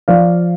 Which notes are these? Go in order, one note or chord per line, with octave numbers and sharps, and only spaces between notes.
F3 D5 F5